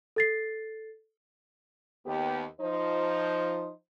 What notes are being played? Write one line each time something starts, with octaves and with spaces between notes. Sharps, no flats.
A4 A6 C7
D#2 B3 G4
F3 D#4 C5